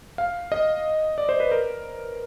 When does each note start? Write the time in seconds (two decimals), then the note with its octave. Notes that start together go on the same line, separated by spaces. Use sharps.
0.18 F5
0.52 D#5
1.18 D5
1.29 C5
1.40 B4
1.52 A#4